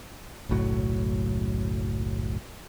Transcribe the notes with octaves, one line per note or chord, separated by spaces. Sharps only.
F#1 B1 A2 F#3